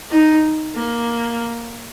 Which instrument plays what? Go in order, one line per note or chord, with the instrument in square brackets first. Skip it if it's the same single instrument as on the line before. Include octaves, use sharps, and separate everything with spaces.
[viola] D#4
A#3